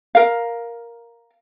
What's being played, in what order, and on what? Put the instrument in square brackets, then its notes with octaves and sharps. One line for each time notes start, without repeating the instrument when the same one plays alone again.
[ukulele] A#4 F5